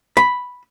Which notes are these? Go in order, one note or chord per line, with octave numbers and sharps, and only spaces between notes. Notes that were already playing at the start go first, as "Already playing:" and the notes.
B5